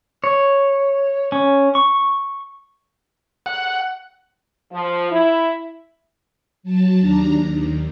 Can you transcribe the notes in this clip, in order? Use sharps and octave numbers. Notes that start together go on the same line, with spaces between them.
C#5
C#4
C#6
F#5
F3
E4
F#3 A5
D#2 D4 A#5
D#2